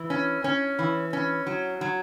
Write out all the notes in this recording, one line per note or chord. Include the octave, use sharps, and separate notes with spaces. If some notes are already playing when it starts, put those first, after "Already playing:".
Already playing: E3
C#4
C#4
E3
C#4
F#3
F#3